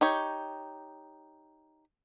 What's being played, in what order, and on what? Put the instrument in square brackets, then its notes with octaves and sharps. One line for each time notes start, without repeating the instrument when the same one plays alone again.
[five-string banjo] D#4 G4 C#5